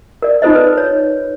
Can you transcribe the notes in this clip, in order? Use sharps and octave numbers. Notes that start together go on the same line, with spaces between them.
A#4 D5
D#4 F4 A4 C5 D#5
B4
C#5